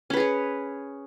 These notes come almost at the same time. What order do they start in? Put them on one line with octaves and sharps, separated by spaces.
C#4 B4 G#4 C#5